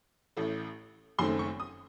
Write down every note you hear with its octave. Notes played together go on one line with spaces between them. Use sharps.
A1 A2 A3
F#1 F#2 D#3 A3 C4 C6
C#6
D#6